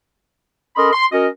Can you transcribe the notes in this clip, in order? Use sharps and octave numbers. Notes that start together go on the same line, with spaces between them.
C#4 A4 A#4 D#5 B5 C6
C6
C#4 F#4 A#4 D#5